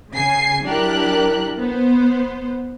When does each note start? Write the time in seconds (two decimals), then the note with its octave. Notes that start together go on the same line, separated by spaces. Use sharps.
0.13 C#3 G#5 C7
0.64 F#3 D4 E4 G4 A#4 F#6
1.59 B3 C5